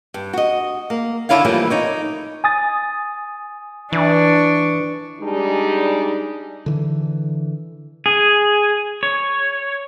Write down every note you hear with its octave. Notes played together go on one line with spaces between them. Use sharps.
G2
F#4 D#5
A#3
D3 D4 E4 F4 C#5 F5
E3 F3 G3 A3 A#3
D#4 C#5 D5
G#5 D#6 A6
E3 D4 C#6
G3 G#3 D4 D#4 G#4
D3 E3
G#4
C#5